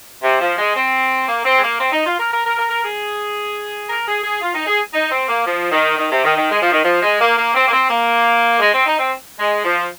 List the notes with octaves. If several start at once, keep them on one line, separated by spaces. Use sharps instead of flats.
C3
F3
G#3
C4
A#3
C4
G#3
A#3
C4
D#4
F4
A#4
A#4
A#4
A#4
A#4
G#4
A#4
G#4
G#4
F4
D#4
G#4
D#4
C4
A#3
F3
D#3
D#3
C3
D#3
D#3
G#3
F3
D#3
F3
G#3
A#3
A#3
C4
A#3
C4
A#3
G#3
C4
D#4
C4
G#3
F3